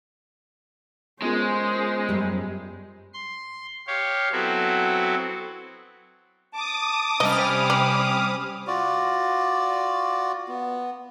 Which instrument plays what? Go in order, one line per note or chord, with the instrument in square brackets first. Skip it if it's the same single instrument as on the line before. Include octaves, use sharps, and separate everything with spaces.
[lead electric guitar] G#3 [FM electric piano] B3 F4 A#4 [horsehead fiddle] C#4 C5
[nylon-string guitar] F#2 G3
[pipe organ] C6
G4 C#5 F5
F#3 B3 C4 E4 F#4 A4
[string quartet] A5 [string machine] D6 D#6
[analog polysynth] C3 G3 F6 [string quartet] C#4 C5 B5 [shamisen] D#5
[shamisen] D5
[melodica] F4 F#4 D5
B3